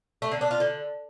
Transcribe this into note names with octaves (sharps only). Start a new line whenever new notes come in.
A3
D3
D4
F4
D3